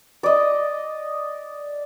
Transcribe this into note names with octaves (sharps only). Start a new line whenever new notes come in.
D5 D#5